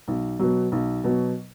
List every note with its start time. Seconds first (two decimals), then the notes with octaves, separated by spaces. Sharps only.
0.08 B1
0.39 B2 F#3
0.72 B1
1.04 B2 F#3